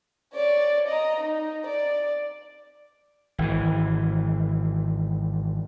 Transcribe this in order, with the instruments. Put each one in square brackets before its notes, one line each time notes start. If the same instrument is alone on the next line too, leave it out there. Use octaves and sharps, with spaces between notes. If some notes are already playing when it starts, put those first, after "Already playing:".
[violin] C#5 D5
D#5 A#5
D#4
D5
[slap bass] G#1 E3